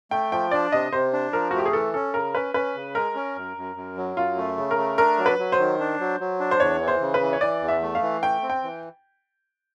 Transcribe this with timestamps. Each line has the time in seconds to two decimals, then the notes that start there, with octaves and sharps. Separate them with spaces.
0.11 A3 G5
0.32 F3 G5
0.51 D4 D5
0.72 C3 D#5
0.92 C3 C5
1.13 D4
1.33 F3 A#4
1.51 F#4
1.54 A3 G4
1.66 G#4
1.73 E3 A4
1.94 C#4 A4
2.14 C#3 A#4
2.34 C#4 B4
2.54 C#4 B4
2.76 C#3
2.95 G#3 A#4
3.15 C#4
3.36 F#2
3.57 F#2
3.76 F#2
3.97 F#3
4.17 F#2 F4
4.37 A3
4.58 C#3
4.71 A#4
4.78 A3
4.98 D4 A#4
5.18 F#3
5.26 B4
5.39 F#3
5.52 C5
5.59 D#3
5.80 D4
6.00 F#3
6.20 F#3
6.40 D4
6.51 C5
6.60 E2 C#5
6.81 E3
6.88 C5
7.01 C#3
7.14 B4
7.22 E3
7.33 C#5
7.41 E3 D5
7.62 E2
7.68 E5
7.82 A3
7.95 F5
8.02 E3
8.22 A3 G5
8.42 C4
8.50 G5
8.63 E3